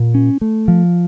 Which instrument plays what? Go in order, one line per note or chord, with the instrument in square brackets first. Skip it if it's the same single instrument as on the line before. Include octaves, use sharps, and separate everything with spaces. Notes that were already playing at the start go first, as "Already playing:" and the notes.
Already playing: [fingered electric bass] A#2
C#4
A3
F3